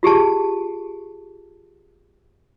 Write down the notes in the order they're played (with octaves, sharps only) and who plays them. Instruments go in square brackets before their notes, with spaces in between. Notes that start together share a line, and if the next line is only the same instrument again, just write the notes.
[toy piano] F4 G4 G#4 A5